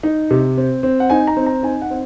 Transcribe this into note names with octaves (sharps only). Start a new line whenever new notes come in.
D#4
C3
C4
C4
F#5
D#4 G#5
A#5
C4
A#5
D#4 G#5
F#5
C4